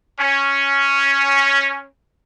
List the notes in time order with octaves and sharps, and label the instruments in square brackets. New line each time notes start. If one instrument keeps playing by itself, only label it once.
[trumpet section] C#4